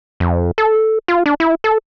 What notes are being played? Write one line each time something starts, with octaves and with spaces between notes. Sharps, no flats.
F2
A4
F4
D4
E4
A4